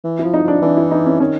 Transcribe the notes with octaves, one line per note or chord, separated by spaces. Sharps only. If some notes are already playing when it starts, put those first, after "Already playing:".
E3
E4
F3
D#4
F3 D4
E3 D4
E4
D#4
C#4
D#3 C#4